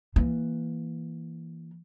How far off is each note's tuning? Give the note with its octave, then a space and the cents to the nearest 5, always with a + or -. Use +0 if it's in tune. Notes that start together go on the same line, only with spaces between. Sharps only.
E3 +0 A#3 +0